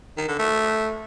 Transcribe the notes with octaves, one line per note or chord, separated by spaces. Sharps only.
D#3
D3
A3